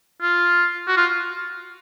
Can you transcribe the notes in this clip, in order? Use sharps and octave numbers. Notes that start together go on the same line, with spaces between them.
F4
F#4
F4